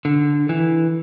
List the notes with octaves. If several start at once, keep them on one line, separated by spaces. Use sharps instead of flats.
D3
E3